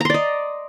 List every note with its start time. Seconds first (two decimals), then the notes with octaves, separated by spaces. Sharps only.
0.01 A#5
0.05 C6
0.10 D5
0.14 D#5